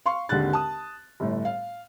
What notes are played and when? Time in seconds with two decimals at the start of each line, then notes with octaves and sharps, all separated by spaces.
0.06 F5 C6 C#6
0.29 G#1 D#2 D3 G#3 F#6 A6
0.53 A5 D#6
1.20 G1 A2
1.45 F5